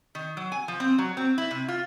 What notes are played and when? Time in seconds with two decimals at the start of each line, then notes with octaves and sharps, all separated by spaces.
0.15 D#3
0.37 F#3
0.52 G#5
0.68 F3
0.80 C4
0.98 F#3
1.17 C4
1.38 E4
1.51 C3
1.68 F4